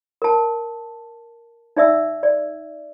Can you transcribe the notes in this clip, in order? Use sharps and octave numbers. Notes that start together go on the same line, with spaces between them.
A#4 A5
D#4 D5 E5 E6
D5